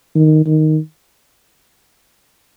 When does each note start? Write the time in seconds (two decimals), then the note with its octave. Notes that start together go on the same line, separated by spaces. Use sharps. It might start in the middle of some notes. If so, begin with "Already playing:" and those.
0.15 D#3
0.46 D#3